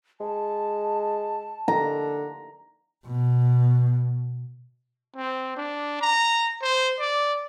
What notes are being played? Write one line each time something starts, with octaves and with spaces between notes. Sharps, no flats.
G#3 A5
D3 A#5
B2
C4
D4
A#5
C5
D5